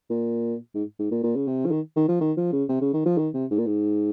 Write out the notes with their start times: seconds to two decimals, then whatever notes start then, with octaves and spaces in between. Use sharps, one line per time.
0.10 A#2
0.75 G#2
0.99 G#2
1.11 A#2
1.24 A#2
1.36 C#3
1.48 C3
1.66 F3
1.72 D#3
1.96 D#3
2.09 F3
2.21 D#3
2.37 F3
2.53 C#3
2.69 C3
2.81 C#3
2.94 D#3
3.06 F3
3.18 D#3
3.34 C3
3.51 G#2
3.58 A#2
3.66 G#2